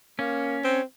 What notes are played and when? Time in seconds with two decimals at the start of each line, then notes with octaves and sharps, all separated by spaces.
0.19 A#3 C#4
0.64 C4